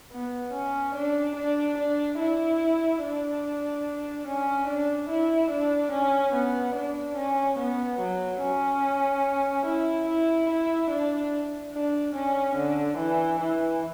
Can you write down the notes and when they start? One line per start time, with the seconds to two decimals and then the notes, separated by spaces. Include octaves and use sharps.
0.12 B3
0.53 C#4
0.95 D4
1.36 D4
1.77 D4
2.19 E4
3.03 D4
4.27 C#4
4.68 D4
5.09 E4
5.50 D4
5.92 C#4
6.34 B3
6.75 D4
7.17 C#4
7.59 B3
8.00 F#3
8.41 C#4
9.66 E4
10.07 E4
10.49 E4
10.90 D4
11.73 D4
12.15 C#4
12.56 D3
12.98 E3
13.40 E3